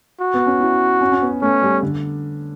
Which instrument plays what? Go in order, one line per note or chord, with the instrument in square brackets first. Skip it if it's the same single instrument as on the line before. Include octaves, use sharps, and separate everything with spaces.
[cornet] F#4
[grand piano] B3
C#4
E4
C#4
C#4
B3
[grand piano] A3 [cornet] C#4
[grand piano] G3
D3